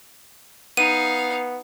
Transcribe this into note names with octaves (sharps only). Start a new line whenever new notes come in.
B3 D#4 F5 D#7